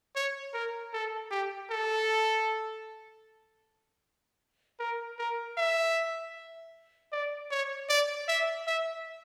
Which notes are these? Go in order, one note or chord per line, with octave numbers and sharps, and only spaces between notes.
C#5
A#4
A4
G4
A4
A#4
A#4
E5
D5
C#5
D5
E5
E5